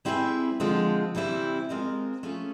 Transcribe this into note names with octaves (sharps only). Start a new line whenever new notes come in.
G3 C4 E4 G#4 B4
D3 F3 G#3 C4 F4
C3 E3 G3 C4 E4
G#3 C4 F4 A#4 D#5
A3 C#4 F4 G#4